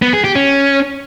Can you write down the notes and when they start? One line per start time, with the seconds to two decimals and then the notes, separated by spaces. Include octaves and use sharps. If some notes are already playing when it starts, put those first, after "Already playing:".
0.02 B3
0.13 G#4
0.24 G4
0.35 C#4